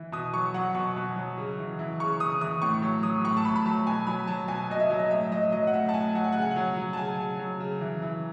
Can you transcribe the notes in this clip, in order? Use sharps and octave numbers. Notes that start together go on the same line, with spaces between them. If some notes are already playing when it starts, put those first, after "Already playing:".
Already playing: E3
B2 D#6
F#3 C#6
F#3 F#5
B2 C#6
B2
F#3
C#3
E3
E3
C#3 C#6
C#3 D#6
E3 D#6
A2 C#6
F#3
F#3 D#6
A2 C#6
A5
A2 B5
B5
F#3 A5
B2 G#5
F#3 B5
F#3 A5
B2 G#5
B2 D#5
E5
F#3
D#5
A2 E5
F#3 D#5
F#3 D#5
F#5
A2 E5
A5
A2 G#5
F#3 F#5
G#5
C#3 F#5
G#5
F#3 F#5
F#3
A5
C#3 G#5
C#3
F#3
C#3
E3
E3